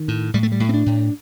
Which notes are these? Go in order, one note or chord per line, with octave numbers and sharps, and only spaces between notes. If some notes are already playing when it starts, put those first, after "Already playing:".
Already playing: D#3
A2
A2 G3
A3
G3
A2
C4
D4
A2